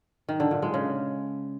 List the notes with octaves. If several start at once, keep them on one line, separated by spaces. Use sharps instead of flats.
D#3
D3
A#2
G#3
C#3